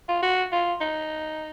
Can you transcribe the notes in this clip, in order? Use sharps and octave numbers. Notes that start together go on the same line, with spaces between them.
F4
F#4
F4
D#4